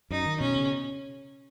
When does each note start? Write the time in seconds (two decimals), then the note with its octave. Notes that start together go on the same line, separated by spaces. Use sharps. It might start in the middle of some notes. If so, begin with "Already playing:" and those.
0.11 F#2 D#4
0.26 D#3
0.40 B2 C#4
0.56 C#3